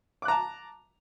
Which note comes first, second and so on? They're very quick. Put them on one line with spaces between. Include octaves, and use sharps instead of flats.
D6 F#6 A#5 A5